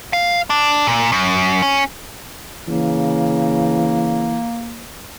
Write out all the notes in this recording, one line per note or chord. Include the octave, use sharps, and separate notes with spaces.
F5
D4
A#2
F#2
C#4
C#3 E3 A#3